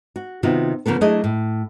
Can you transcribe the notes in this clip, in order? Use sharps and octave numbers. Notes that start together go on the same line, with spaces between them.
F#4
C3 D#3 B3 F4 F#4
C#3 F3 A#3 B3 A4
F#3 A3 D4 E4 G#4 D#5
A2